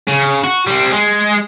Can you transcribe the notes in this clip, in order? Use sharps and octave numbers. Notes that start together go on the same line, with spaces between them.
C#3
F#4
G3 C4
G#3